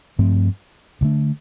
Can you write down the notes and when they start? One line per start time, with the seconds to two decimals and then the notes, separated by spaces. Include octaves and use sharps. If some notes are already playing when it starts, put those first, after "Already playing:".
0.19 G2 F3 A3 C4
1.01 D2 D3 A3 D4